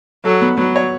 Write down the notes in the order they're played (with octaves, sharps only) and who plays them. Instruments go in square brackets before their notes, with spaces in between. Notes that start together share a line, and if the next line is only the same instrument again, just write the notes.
[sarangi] F#3 [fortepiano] A4
[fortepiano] B3
[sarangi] F#3 [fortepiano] B3
[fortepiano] C#5